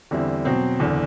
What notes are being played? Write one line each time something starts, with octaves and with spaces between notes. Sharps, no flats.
E2 D3 G3 C4 E4
B2 F#3 C4
F#1 E2 D3